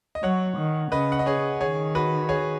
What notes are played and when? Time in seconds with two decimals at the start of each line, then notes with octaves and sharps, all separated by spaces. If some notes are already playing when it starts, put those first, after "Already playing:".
0.15 D#5
0.23 F#3 C#5 F#5
0.58 D#3
0.92 C#3 B4 D#5
1.12 F#5
1.19 D#5
1.26 G#4 C#5
1.61 D#3 G#4 C#5
1.95 F#4 B4
2.29 G#4 C#5